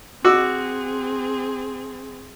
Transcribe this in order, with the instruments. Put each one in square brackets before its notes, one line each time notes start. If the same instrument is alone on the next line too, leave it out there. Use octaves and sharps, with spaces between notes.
[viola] C4 G#4 [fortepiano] F#4 D6 E6